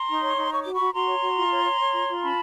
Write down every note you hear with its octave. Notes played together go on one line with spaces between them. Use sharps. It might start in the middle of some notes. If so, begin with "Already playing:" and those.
Already playing: A#5 C6
D#4
C#5
D#4
C#5 C#6
F#4 D6
B5 C#6
F#4
F#4 A#5 C6
C#5
F#4
F4
C#5
C#5
C#5
F4
F4
C#4 A5 B5